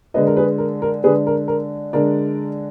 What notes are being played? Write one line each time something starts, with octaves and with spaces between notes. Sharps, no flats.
D3 G#3 D4 B4 D#5
A#4
G#4 B4
A#4
A#4
D3 G#3 D4 G#4 B4
A#4
A#4
D3 G#3 D4 A#4 D5